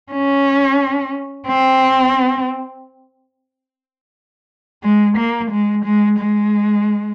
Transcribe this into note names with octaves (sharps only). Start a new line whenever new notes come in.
C#4
C4
G#3
A#3
G#3
G#3
G#3